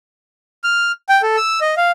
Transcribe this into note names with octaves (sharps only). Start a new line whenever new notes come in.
F6
G5
A4
E6
D#5
F5